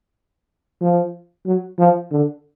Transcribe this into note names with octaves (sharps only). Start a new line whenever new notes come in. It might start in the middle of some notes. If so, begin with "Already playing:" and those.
F3
F#3
F3
D3